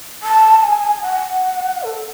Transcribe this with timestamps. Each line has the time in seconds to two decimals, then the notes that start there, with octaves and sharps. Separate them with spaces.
0.23 A5
0.64 G#5
1.02 F#5
1.83 A4